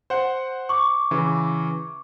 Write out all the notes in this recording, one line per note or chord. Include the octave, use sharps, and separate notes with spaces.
C5 F#5
C#6 D6
C#3 E3